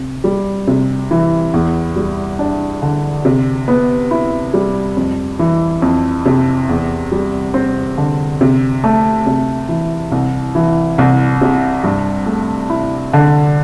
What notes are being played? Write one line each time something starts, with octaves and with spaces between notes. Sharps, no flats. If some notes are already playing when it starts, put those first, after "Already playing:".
Already playing: C3
G3
C3
E3
E2
G3
D4
D3
C3
B3
E4
G3
F2
E3
F2
C3
E2
G3
C4
D3
C3
A3
C3
E3
C2
E3
C2
C3
G2
A3
E4
D3